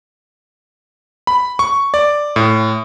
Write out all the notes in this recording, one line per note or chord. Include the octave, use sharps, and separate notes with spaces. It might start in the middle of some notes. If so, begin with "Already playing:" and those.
B5
C#6
D5
A2